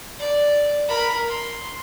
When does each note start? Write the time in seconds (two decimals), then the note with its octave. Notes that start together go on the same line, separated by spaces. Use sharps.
0.19 D5
0.88 A#4 B5
1.28 C6